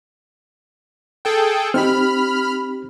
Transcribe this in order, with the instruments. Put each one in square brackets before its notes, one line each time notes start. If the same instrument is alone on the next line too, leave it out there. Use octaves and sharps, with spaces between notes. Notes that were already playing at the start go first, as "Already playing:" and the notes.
[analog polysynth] G#4 A4 G5
[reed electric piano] C4 D#4 G4 [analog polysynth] B5 F6